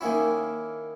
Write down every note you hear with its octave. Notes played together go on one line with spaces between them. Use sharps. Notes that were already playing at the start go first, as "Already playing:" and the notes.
D#3 A#3 C#4 E4